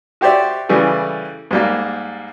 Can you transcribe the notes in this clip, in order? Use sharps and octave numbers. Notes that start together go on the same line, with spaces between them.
F#4 G4 C5 D5 E5
C#3 E3 G3 A3
G#2 G3 A#3